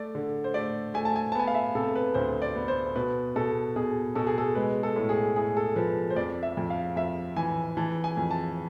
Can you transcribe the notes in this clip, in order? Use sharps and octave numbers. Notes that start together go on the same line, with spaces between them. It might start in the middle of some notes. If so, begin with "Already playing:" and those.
Already playing: A3 D5
D3
C5
A3 D5
A3 G#5
A5
G#5
A5
B3 G#5
F5
E5
C3 A4
B4
D2 C5
D5
B3
C5
B2 B4
B2 A4
B2 G#4
B2 A4
G#4
A4
G#3 B4
A4
A2
G#4
A2 G#4
A4
F3 B4
C5
F2 D5
E5
F2
F5
F2 E5
E3 G#5
E3 A5
G#5
F2
A5